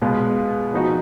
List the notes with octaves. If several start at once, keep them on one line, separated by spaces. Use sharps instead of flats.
B2 G#3 B3 F4
F3 B3 D#4 F#4